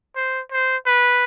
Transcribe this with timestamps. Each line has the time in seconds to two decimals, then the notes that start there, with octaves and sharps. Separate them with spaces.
0.16 C5
0.52 C5
0.86 B4